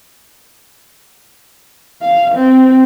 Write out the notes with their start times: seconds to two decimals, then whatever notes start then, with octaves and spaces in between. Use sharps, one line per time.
2.02 F5
2.34 C4